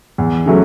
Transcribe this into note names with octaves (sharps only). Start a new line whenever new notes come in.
E2
C#3 F#3 A3 C#4